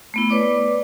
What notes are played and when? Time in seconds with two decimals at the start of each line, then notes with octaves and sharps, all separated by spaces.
0.14 A3 B3 E4
0.30 B4 C#5 D5 D6